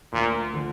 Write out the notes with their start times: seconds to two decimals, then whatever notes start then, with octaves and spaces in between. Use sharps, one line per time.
0.13 D2 A#2 D3 F3
0.54 D3 F3